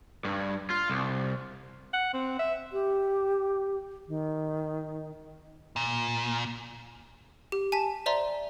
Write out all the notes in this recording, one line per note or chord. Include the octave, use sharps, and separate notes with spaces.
G2
F4
C2
F#5
C4
E5
G4
D#3
A#2
G4
G#5 A5 B6 E7
C5 D5 E5 A#5 C6